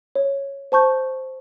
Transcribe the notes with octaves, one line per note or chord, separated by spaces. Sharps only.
C#5
C5 A5 C#6 G6